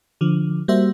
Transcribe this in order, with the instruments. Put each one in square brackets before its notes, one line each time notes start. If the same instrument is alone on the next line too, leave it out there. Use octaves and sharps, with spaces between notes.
[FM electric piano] D3 F3
G3 A#3 F#4 C5 E5